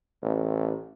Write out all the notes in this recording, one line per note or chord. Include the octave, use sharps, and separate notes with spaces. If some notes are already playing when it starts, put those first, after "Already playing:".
A1